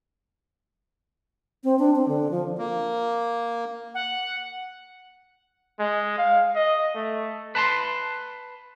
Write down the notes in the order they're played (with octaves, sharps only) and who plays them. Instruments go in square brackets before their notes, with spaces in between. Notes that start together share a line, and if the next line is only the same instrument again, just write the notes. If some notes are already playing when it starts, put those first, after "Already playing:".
[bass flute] C4
D4
C4
D3
F3
[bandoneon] A#3
[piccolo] F#5
[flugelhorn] G#3
F5
D#5
A3
[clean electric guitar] B4 A5 A#5 C6